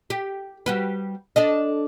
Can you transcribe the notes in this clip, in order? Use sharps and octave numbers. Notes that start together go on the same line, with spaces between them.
G4
G3 F#4 B4
D4 A4 D#5